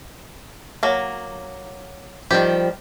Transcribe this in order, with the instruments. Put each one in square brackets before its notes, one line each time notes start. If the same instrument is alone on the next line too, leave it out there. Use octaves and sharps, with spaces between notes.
[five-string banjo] F#3 A#3
[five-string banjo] D#3 G4 [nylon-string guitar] F3 G3